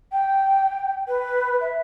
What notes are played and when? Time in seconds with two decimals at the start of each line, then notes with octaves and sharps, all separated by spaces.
0.12 G5
1.08 B4
1.61 E5